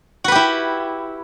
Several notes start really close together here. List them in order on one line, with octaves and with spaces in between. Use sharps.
F#4 B4 G4 E4